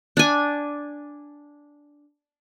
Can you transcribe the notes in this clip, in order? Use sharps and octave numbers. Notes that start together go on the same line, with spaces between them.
D4 G#5